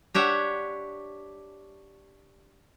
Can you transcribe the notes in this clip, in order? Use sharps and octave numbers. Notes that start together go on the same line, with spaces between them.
D4 G4 C#5 E5 F#5